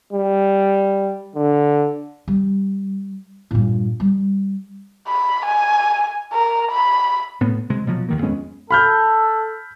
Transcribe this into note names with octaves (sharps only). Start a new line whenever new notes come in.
G3
D3
G3
G2 A#2
G3
B5
G#5
A#4
B5
A2 B3
C3 G#3
B2 F3 F#3
D#2 D#3 A#3
F2 G#3 B3 C#4
A4 B5 F6 G6